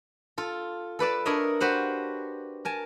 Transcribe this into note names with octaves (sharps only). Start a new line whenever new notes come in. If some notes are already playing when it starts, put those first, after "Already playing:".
F4 A4
A4 B4 D5 A5
D4 A#4 C#5 D#5 E5
F#4 G4 B4 C5 F5 F#5
A#4 G#5 A5